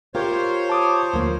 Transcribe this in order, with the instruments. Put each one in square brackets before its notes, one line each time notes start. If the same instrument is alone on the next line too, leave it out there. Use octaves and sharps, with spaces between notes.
[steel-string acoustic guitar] F4 G4 A#4 [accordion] C5 C#5
[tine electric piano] A5 D6 D#6
[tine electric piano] D2 [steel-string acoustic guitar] F3 A#3